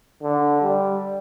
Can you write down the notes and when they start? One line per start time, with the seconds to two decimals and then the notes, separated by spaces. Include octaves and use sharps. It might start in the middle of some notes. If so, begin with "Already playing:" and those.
0.22 D3
0.62 G3